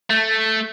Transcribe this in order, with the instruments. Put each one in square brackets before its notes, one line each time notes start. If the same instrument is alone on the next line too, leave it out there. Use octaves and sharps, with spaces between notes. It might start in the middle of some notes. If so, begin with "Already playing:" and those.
[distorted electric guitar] A3